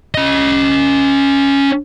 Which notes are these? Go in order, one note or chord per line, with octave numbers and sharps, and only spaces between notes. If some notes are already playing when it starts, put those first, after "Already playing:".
C#4 D#5